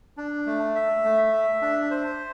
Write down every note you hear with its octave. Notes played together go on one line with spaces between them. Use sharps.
D4
A3
E5
A3
E5
D4
C5